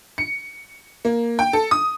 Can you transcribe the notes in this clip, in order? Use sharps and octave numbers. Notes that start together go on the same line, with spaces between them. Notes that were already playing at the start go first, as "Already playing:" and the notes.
C#7
A#3
G5
A4
D#6